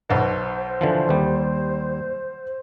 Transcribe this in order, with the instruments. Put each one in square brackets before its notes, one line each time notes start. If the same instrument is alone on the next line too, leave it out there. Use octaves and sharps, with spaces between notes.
[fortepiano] B1 B2 [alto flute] C5
[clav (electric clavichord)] D3 E3 F3
D#2 G3